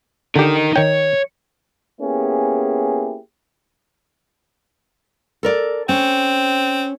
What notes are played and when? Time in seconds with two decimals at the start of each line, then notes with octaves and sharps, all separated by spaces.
0.36 D3 D#4 G4 A#4
0.76 D#3 C#5 G5
2.01 A#3 B3 C#4 E4 G4 G#4
5.43 A4 A#4 D5
5.89 C4 C#4